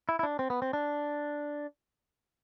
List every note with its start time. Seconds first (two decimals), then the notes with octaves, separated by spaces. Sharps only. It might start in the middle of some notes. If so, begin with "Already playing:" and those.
0.09 E4
0.19 E4
0.23 D4
0.39 C4
0.50 B3
0.62 C4
0.73 D4